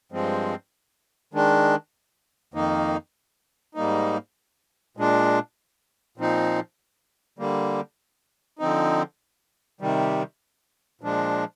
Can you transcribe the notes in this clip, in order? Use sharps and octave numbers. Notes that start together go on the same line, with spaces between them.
G2 F3 G#3 C4
D#3 G#3 D4
F2 D#3 A#3 D#4
G#2 G3 A#3 D#4
A#2 G#3 D4
A#2 F3 C4 D#4
D3 G3 A#3
D3 F3 C4 D#4
C3 D#3 G3
A#2 F3 G#3 D4